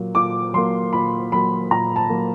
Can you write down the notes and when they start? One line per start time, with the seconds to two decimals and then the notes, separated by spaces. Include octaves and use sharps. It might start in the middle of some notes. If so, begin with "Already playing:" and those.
Already playing: A#2 F#3 A#3
0.15 A#2 D6
0.54 F#3 A#3 C6
0.93 A#2 B5
1.32 F#3 A#3 B5
1.71 A#2 A#5
1.96 A5
2.10 F#3 A#3